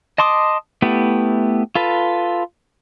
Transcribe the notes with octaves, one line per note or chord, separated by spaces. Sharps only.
D#5 A5 C6 D6 D#6
A3 B3 E4 G4
F4 A4 B4